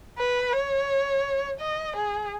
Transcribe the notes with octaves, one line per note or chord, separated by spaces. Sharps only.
B4
C#5
D#5
G#4